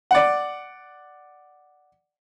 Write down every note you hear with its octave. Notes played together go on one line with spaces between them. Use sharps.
D5 F#5